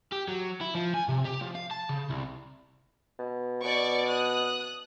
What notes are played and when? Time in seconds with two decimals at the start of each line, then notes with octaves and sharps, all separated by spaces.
0.12 G4
0.28 F#3
0.61 E4
0.75 F3
0.94 G#5
1.09 C3
1.25 G4
1.41 F3
1.55 F5
1.71 A5
1.89 C#3
2.10 C2
3.19 B2
3.64 B2 D5 C#6 D6
4.08 D#6 F#6